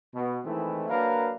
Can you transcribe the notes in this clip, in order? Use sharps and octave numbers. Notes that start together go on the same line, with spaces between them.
B2
D#3 E3 G#3 A3 C4 E4
F#3 A#3 D4 A#4 B4 F5